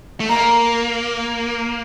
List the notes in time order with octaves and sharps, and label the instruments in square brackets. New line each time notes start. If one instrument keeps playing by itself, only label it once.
[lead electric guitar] A3
[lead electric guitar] A#3 [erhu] A#5